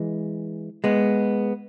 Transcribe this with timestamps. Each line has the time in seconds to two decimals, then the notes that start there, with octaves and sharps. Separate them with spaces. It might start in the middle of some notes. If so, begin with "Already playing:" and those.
Already playing: E3 G#3
0.84 G#3 B3